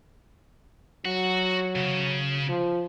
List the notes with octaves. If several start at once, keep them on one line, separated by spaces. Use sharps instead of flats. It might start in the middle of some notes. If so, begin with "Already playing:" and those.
F#3 F#4 F#5
C#3
F3